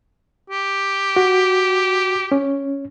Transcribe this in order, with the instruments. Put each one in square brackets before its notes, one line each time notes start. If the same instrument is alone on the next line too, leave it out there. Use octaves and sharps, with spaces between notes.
[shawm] G4
[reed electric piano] F#4
C#4